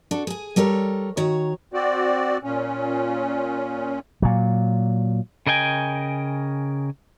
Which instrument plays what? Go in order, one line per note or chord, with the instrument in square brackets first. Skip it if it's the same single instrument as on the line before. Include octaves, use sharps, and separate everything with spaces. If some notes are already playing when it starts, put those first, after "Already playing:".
[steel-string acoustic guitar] D4 F#4 A4
G#4 G#5
G3 A4 A#4 C#5
D#3 F#4 C#5 A#5
[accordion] C4 F#4 D5
A#2 C#4
[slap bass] A#2 F#3
[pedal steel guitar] C#3 A#4 D#5 G5 G#5